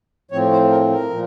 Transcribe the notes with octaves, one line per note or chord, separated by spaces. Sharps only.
A2 F3 C4 C#5
C5
A#4
A#4
A#2 F3